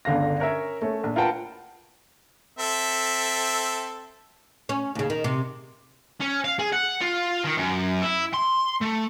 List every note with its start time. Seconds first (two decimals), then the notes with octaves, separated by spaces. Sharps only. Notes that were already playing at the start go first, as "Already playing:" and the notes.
0.05 G1 C#2 D3 F5 A#6
0.40 C#4 A#4 C#5 E5
0.82 A3 C#4
1.03 A#1
1.16 F4 A#4 B4 F#5 G5 A5
2.59 C4 A4 E5
4.69 C#4
4.95 D#2 C#3
5.10 D#3
5.24 C3
6.20 C#4
6.44 F5
6.59 G#4
6.73 F#5
7.01 F4
7.44 D#3
7.57 F#2
8.02 E4
8.34 C6
8.81 A3